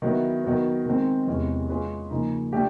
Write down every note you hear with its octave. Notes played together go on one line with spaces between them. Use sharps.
D#3 F#3 B3 E4
D#3 F#3 B3
D#3 G#3 C4
E2 C3 E3 G#3 C#4
G#3 C#4 F4 G#4 B4
C#3 F3 A#3 D#4
A3 D4 G4